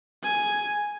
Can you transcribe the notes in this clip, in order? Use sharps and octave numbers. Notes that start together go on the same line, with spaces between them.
G#5